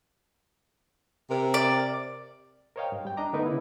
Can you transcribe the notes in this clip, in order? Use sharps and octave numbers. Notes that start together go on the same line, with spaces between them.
C3 A#4
D5
A#4 C5 C#5 D#5 F5 G5
G2
G3 G5
D4 D#5 A#5 D6
D3 A3 B3 D#4 A#4 B4
C#3 E4